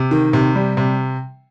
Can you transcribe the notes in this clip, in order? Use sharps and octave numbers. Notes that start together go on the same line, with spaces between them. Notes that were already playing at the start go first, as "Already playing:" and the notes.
Already playing: C3
D#3
C3
G3
C3